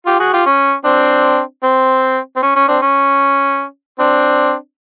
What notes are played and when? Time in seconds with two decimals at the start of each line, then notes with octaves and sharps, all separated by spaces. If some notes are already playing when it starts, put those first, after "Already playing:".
0.06 F4 G4
0.20 F#4 G#4
0.33 F4 G4
0.46 C#4
0.85 C4 D4
1.63 C4
2.36 C4
2.43 C#4
2.56 C#4
2.68 C4 D4
2.82 C#4
3.99 C4 D4